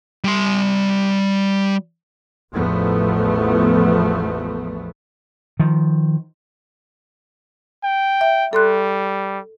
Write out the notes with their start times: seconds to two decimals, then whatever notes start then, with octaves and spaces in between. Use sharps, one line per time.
0.24 G3 C6
2.53 A1 E2 F3 A3 B3
5.60 D#3 F3
7.84 G5
8.21 E5
8.53 G3 A4 C6 F#6